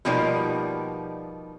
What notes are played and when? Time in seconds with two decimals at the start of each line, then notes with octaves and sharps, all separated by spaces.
0.05 B2 F3 G3 A#3 D#4 D5